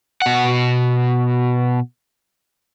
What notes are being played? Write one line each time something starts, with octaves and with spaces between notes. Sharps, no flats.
B2 F#5